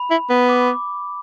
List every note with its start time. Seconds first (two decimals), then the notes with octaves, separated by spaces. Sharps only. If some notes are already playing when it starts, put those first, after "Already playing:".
Already playing: B5
0.11 E4
0.30 B3
0.49 D6